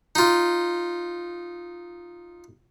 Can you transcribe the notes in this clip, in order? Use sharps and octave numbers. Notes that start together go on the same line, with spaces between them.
D#4 F4